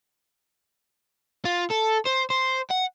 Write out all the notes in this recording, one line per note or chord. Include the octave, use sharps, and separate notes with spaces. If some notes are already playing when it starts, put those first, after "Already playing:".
F4
A4
C5
C5
F#5